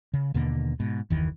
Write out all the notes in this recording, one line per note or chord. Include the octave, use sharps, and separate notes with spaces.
C#3
D#2 B2 D3 A#3
G#2 B2
F#1 D#2 D#3 E3